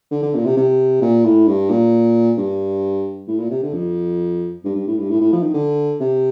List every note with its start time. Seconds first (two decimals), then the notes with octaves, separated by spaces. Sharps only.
0.11 D3
0.22 D3
0.35 A#2
0.45 C3
0.57 C3
1.01 A#2
1.25 A2
1.47 G2
1.70 A#2
2.37 G2
3.28 A2
3.39 A#2
3.50 C3
3.63 D3
3.74 F2
4.64 G2
4.75 G2
4.87 A2
4.98 G2
5.10 A2
5.20 A2
5.32 F3
5.43 D#3
5.54 D3
6.00 C3